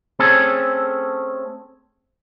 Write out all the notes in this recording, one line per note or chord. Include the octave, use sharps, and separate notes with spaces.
A3 C4 C#4 G#4 A4